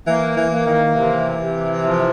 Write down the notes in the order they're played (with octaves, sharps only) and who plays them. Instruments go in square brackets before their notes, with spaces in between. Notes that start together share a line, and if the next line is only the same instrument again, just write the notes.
[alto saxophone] E3 [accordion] A#3
[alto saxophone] E3
[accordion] A#3
[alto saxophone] D#3
[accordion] C3 [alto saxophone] E3
[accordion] C3
F3